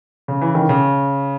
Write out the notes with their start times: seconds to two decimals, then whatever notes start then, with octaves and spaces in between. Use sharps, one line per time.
0.28 C#3
0.42 E3
0.55 D#3
0.69 C#3